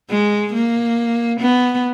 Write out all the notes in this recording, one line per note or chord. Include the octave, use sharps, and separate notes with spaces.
G#3
A#3
B3